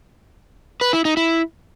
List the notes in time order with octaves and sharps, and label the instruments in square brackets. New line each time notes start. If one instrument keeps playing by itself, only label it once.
[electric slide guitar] B4
E4
D#4
E4